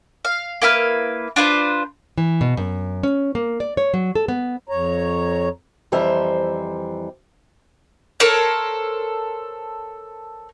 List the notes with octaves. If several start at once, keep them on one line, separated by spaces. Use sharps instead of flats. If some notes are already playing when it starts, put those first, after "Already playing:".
F5
A#3 E4 B4 F6
D4 F4 B4 C5
E3
B2
F#2
C#4
A#3
D5
C#5
F#3
A4
B3
F2 C#5 A#5
F2 E3 G3 C5 E5 A#5
A4 A#4 C5 C#5